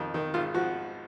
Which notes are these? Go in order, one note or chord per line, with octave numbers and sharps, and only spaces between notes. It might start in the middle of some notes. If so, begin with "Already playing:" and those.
Already playing: F2 D#3
D#3
G#1 F4
F3 F#4